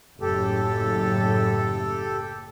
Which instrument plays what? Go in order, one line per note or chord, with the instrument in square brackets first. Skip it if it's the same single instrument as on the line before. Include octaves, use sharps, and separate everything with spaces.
[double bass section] F#1 A2 [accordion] G4 A4